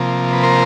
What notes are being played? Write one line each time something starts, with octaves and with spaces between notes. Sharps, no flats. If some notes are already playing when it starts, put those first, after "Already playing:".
Already playing: C3 F3 A#3
B4
A#4 C5